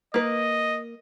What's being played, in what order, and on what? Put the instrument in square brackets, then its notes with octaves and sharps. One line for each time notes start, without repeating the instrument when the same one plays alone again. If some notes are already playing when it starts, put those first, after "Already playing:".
[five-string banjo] A#3 B4 [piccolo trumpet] D#5